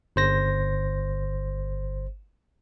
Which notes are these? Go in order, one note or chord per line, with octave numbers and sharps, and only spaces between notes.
G1 C5 A#6